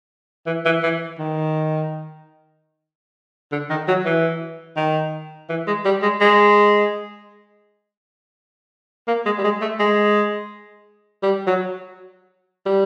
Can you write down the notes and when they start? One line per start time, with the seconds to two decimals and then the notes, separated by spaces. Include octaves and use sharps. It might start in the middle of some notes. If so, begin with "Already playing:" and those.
0.47 E3
0.65 E3
0.83 E3
1.19 D#3
3.52 D3
3.70 D#3
3.88 F#3
4.06 E3
4.77 D#3
5.50 E3
5.67 G#3
5.85 G3
6.02 G#3
6.21 G#3
9.08 A#3
9.26 G#3
9.38 G3
9.44 G#3
9.62 A3
9.79 G#3
11.23 G3
11.47 F#3
12.66 G3